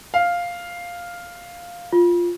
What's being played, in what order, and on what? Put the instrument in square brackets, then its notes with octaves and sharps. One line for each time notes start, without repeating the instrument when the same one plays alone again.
[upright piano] F5
[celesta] F4